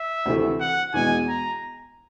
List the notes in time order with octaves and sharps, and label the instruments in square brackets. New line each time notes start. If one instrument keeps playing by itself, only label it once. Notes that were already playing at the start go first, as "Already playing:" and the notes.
Already playing: [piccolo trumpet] E5
[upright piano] D2 C3 E3 A3
[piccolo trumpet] F#5
[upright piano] E2 B2 G#3 [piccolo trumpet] G#5
[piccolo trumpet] A#5